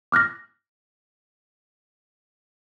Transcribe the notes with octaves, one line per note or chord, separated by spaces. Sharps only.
D6 F6 F#6 A#6